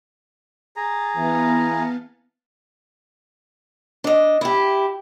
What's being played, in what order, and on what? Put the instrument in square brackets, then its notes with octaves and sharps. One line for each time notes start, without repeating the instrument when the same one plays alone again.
[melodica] G#4 A#5 [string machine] A6
[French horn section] E3 [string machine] B3 F5 A5
[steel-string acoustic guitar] D4 D#5
E4 G4